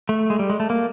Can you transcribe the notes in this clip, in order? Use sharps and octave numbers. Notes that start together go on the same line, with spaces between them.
A3
G#3
G3
G#3
A3
A#3